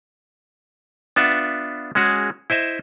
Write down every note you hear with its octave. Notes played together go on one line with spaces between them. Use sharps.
B3 D4 F4 E5 F#5
G#3 C#4 F#4 G#4
E4 C5 D#5 E5